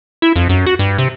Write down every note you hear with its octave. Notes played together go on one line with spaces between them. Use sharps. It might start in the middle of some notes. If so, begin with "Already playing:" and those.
E4
F2
F#2
F#4
G2
C3